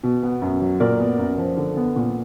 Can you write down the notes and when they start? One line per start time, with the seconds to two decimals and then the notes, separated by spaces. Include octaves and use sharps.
0.04 B2
0.23 B3
0.42 F#2
0.61 F#3
0.80 A#2 A#4 D5
1.00 B3
1.19 F#2
1.38 F3
1.57 D3
1.77 B3
1.96 A#2